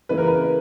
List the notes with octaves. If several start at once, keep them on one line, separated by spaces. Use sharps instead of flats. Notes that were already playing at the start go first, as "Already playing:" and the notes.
C#3 E3 A#3 B4
A#4
B4